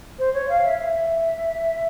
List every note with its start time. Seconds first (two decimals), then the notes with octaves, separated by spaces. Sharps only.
0.19 C5
0.33 C#5
0.49 F5
0.65 E5
0.79 E5